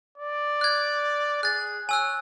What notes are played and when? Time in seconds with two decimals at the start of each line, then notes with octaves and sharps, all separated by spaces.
0.18 D5
0.61 F#6 G#6
1.43 G#4 F#6 A6
1.89 C#5 G#5 E6 F#6